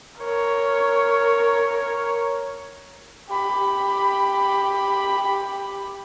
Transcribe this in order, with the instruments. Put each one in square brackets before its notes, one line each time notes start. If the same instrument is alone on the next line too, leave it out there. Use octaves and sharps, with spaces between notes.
[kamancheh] A#4 C#5
G4 B5